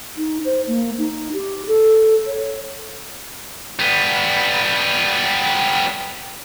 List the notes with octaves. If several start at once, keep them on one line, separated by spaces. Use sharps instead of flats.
D#4
C5
A#3
D#4
G4
A4
C#5
G3 B3